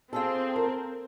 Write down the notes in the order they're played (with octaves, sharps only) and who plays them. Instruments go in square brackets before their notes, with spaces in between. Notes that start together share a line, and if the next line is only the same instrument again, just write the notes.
[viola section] C4 [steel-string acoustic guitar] F4 G#4 A4
[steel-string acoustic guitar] A#4